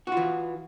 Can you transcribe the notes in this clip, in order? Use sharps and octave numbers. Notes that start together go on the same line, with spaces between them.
E3 F4 F#4